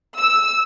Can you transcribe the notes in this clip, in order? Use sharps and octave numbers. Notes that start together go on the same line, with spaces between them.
E6